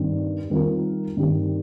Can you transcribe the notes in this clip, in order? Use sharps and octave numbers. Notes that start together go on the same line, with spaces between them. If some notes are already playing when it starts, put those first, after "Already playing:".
Already playing: G2 D#3 C4 D#4
D#3 G3 C4 F4 A#4
G2 D#3 C4 G4